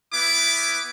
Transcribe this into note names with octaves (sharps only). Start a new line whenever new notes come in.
B3 E4 D6